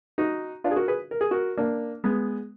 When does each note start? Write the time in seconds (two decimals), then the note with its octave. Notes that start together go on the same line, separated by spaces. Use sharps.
0.18 D#4 F#4
0.64 D4 F4
0.71 G#4
0.76 F#4 A#4
0.88 G#4 B4
1.11 A#4
1.21 G#4
1.31 F#4 A#4
1.58 A#3 D4
2.04 G#3 B3